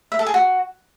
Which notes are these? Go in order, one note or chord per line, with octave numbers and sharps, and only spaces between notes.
E5
A4
G#4
F#4